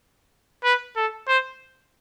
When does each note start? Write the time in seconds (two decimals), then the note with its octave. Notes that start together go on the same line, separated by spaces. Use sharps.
0.64 B4
0.97 A4
1.28 C5